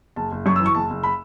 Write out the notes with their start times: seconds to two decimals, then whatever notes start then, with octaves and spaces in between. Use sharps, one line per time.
0.16 F#1 A5
0.32 F#1
0.46 F#2 C#6
0.56 E6
0.60 E3
0.66 C#6
0.75 F#1 A5
0.90 F#1
1.03 B5